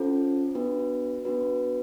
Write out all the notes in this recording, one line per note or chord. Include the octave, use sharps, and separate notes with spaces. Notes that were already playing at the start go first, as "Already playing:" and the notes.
Already playing: C#4 F4 A4 C5
B3 D4 F#4 B4
B3 D4 F#4 B4